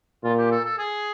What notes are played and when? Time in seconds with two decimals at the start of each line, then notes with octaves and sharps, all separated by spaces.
0.23 A#2 F4
0.38 G4
0.51 A4
0.64 A4
0.78 G#4